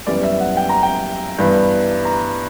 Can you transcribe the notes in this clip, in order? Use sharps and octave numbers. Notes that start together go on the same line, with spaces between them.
F#2 E3 G3 B3 D5
E5
F#5
G5
A#5
G5
G2 E3 B3
A#5